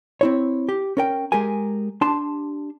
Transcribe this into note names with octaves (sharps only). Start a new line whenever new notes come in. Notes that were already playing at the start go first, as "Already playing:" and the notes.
C4 E4 C#5
G4
C#4 A#4 G5
G#3 G4 G#4 A#4 G#5
D4 G4 A5 C6